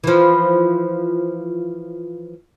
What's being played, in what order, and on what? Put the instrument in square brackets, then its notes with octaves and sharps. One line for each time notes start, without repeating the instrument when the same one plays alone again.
[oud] E3 F3